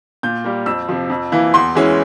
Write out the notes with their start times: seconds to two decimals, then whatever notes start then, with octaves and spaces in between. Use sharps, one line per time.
0.23 A#2 G6
0.44 G3 A#3
0.66 F2 E6
0.88 C3 F3
1.10 F2
1.32 E3 A#3 E4
1.54 E2 C6
1.75 E3 G#3 C#4 E4